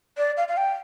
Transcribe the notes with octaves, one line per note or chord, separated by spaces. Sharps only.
D5
F5
F5
G5